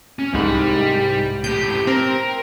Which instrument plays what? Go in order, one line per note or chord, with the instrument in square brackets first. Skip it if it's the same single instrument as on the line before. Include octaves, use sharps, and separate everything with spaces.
[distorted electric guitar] C#4
[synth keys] C2 G#2 [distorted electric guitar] G3 B5
[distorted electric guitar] A2 G4 [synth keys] G6
[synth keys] C4 [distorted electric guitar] A#4